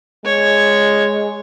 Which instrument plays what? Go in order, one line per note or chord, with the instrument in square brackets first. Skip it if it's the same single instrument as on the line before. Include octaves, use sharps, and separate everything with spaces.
[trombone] G#3 [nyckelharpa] C#5